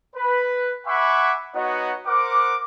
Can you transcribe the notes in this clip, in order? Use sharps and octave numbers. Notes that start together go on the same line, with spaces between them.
B4
E5 F#5 G#5 B5 C#6 D6
B3 D#4 F#4 C#5 D#5 F#5
A#4 C5 F#5 D6